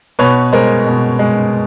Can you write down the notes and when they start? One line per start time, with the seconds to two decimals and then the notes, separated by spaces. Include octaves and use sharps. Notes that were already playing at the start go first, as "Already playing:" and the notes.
0.19 B2 B4 C#5
0.53 G#3 A#4 C5
0.86 B2
1.19 G#3